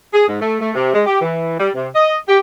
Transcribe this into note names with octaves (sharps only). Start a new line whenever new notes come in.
G#4
G#2
A3
A3
C3
G#3
G4
E3
G3
C3
D#5
G4